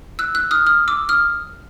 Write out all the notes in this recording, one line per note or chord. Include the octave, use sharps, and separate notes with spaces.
E6 F#6
E6 F#6
D#6 F6
D#6 F6
D6 E6
D#6 F6